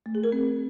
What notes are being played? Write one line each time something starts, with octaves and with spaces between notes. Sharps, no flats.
A3
G#4
A#4
C4